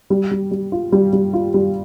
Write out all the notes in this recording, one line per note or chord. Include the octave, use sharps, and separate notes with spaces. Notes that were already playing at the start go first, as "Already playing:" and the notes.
G3
G3
G3
F4
G3
G3
F4
G3